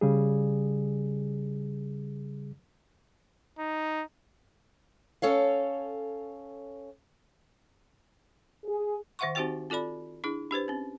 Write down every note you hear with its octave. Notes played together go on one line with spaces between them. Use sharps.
C#3 G3 G#4
D#4
C#4 A4 C#5 F5
G#4
D#3 C5 E5 F#5 C6 C#6
C4 D#4 F#4 G4 C5 G5
C4 F4 A4 D5 B5
D4 E4 G#4
D4 G4 B4 C5
C4 C#4